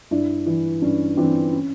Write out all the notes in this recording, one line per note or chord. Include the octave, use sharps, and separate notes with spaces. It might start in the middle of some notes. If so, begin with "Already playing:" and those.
G2 D4 E4
E3
G2 C#4
E3 C4 D4
C#4